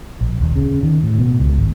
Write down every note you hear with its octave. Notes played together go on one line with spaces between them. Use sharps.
A#1
D#1
C#3
D#3
A2
B2
C#2
G#1